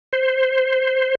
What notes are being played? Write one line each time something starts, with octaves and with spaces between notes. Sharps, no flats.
C5